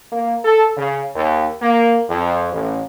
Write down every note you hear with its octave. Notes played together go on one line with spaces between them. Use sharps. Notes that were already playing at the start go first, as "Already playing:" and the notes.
A#3
A4
C#3
D#2
A#3
F2
A1